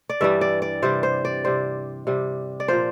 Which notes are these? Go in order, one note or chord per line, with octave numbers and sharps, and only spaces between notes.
D5
G2 E3 G3 E5
D5
D5
C3 G3 C5
C5
D5
C3 G3 C5
C3 G3
D5
A#2 F3 C5